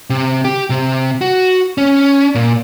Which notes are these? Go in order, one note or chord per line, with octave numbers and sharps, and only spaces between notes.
C3
G4
C3
F#4
C#4
A#2